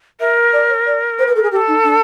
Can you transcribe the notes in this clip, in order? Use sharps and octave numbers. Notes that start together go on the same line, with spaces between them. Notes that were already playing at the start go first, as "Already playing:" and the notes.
A#4 E5
D5
C#5
D5
C5
B4
A4
G#4
G4 A#4
A4
D#4
D4